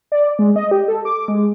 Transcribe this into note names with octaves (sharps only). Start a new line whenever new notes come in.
D5
G#3
D#5
G4
A4
D6
G#3